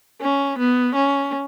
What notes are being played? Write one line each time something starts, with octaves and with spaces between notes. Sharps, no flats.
C#4
B3
C#4